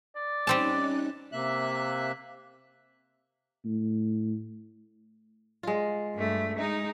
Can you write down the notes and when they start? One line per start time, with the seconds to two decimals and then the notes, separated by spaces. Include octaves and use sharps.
0.16 D5
0.47 G3 C4 C#4 D#4 A5 F#6
1.32 C3 A#3 E5 F#6
3.65 A2
5.63 G#3 F4
6.15 G2 A3
6.58 G#3 D#4